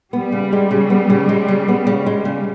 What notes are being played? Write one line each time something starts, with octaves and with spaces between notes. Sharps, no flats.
G3 B3
C#3
G#3
C#3
B3
C#3
G#3
C#3
B3
C#3
G#3
C#3